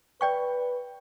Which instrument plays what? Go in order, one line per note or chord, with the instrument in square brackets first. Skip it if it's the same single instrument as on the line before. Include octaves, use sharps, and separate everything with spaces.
[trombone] B4 [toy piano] D5 G5 C#6